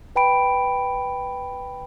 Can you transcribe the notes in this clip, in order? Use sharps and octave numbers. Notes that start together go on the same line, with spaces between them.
B4 G5 B5 D7